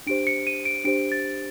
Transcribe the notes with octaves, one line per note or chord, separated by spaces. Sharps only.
D4 G4 C5 D7
C#7
D#7
D7
D4 G4 C5 D7
A6